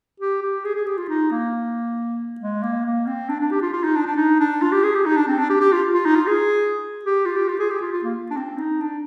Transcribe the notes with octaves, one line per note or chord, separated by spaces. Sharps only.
G4
G4
G#4
G#4
G4
F4
D#4
A#3
G#3
A#3
A#3
C4
D4
D4
G4
F4
F4
D#4
D4
D4
D#4
D4
F4
G4
G#4
G4
D#4
D4
C4
D4
G4
G4
F4
F4
D#4
F4
G#4
G4
F4
G4
F4
G#4
G4
F4
F4
A#3
D4
C4
D#4
D4